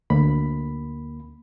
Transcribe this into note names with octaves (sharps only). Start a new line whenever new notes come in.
D2 A#3 B5